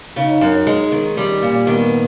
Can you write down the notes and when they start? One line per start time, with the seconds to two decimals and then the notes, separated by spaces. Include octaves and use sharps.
0.16 C#3 D#4
0.41 F#2
0.67 G#3
0.92 D#3
1.16 G3 C#4
1.42 A#2
1.67 D#3 B3